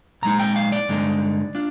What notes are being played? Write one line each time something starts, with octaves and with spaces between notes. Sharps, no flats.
A#2 F3 G#3 D#4 A#5
G5
F5
D5
G2 D3 G#3 D#4
D4 F4